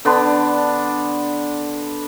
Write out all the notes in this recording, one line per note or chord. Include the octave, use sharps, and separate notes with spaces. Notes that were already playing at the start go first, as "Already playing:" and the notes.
D3 B3 D4 C6